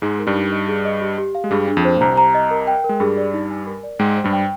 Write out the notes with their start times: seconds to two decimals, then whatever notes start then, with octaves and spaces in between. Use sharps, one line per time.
0.02 G#2 G#3 D#4
0.19 A#4
0.27 G2 G3
0.36 D#4
0.52 D#5
0.68 G#4
0.85 D#5
1.01 G4
1.18 G4
1.35 F5
1.44 G#3
1.51 G2 G3 G#4
1.68 D4
1.77 F2 F3
1.85 C5
1.96 A#2
2.01 C2 C3 A#5
2.18 A#5
2.34 D#5
2.51 A#4
2.67 G5
2.84 A#4
2.89 G#3
3.00 G2 G3 G#4
3.17 D5
3.34 D#4
3.50 G#5
3.67 A#4
3.83 D5
3.99 G#2 G#3 G5
4.17 C5
4.24 G2 G3
4.33 G5